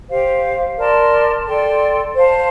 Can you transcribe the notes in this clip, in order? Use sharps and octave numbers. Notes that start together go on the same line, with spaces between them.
G4 C5 F5
A#4 D5 A5 C6
A4 D5 G5 C6
C5 F5 A5